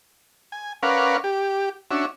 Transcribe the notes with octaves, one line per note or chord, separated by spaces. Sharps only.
G#5
C#4 A#4 B4 D5 F5 F#5
G4
C#4 D4 F#4 E5